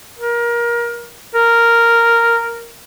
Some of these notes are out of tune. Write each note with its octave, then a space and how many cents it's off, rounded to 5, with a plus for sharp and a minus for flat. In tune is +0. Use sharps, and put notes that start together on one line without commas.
A#4 +25
A#4 -5